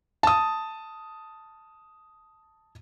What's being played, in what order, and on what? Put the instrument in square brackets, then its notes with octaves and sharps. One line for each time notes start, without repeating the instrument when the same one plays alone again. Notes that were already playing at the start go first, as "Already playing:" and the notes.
[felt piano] A5 D#6